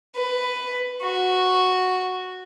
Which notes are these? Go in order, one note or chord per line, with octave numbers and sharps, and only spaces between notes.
B4
F#4